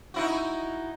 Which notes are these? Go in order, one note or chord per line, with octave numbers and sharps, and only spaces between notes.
D#4 E4 F#4